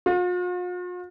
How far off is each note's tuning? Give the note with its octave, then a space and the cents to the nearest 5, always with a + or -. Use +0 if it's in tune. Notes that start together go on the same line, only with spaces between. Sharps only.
F4 +45